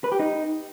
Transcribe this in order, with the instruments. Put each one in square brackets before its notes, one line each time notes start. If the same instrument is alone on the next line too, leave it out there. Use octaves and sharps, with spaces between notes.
[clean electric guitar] B4
G4
D#4